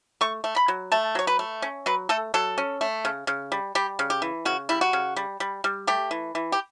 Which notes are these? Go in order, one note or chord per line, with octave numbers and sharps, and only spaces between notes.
A3 C#6
A3
B5
F#3
A3 A5
F#3 C#5
B4
A3
C#4
F#3 B4
A3 A4
F#3 A4
C#4
A3
C#3
C#3
G3
G3 G4
C#3
G4
E3
C#3 F#4
G3 E4
F#4
C#3
G3
G3
G3
A3 G4
E3
E3
G4